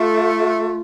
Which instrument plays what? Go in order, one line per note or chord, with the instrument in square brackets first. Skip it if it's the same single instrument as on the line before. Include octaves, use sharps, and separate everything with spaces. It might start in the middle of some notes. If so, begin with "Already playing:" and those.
Already playing: [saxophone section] A3 [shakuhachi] F4